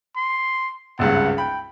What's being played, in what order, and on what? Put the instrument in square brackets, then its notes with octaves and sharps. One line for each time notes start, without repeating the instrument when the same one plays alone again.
[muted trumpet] C6
[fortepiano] G#1 C#2 G2 [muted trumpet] F#5
[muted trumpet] G5 [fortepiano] B5